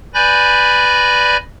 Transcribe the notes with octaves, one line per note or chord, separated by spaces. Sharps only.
B4 D5 G#5 B5 G6 A#6